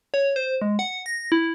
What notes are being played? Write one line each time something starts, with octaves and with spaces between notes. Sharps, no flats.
C#5
C5
G#3
F#5
A#6
E4